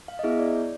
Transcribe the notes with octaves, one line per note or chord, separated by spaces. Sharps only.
F5
D#5
B3 E4 G#4 E5
D5
C#5